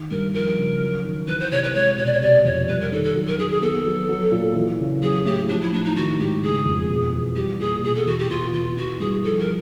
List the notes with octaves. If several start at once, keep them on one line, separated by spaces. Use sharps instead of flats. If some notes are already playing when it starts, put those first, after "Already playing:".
Already playing: D#3
G2 A#4
F3 A#4
C#3
F#3
D#3
E3 B4
C5
C3 C#5
B4
G#3 C#5
B2 C#5
D5
C#5
C3 D5
F2 C#5
G3 B4
A#4
D#3 A4
A4
F#3
A#4
D#3 G#4
G#4
B3 A4
F#3
F#3
A#2
E3
C#3
F#3 G#4
A2 G4
F3 D4
E4
A2 D4
D#4
D#3 F#4
G#2 G4
C#3 G#4
F2
B2
E2
G3 G4
A#2 G#4
B2 G#4
A4
E2 F#4
G4
B2 F4
E2 F4
E3 F#4
G2 G#4
F3 A4
A#4